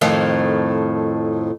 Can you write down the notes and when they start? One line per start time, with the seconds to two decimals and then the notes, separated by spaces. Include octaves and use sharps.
0.01 F2 A2 D#3